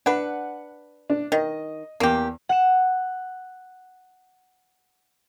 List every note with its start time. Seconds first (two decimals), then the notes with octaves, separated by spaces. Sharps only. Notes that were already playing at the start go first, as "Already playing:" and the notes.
0.06 D4 B4 F#5
1.10 D4
1.32 D#3 D#5
2.00 E2 A#3 G4
2.49 F#5 C#7 E7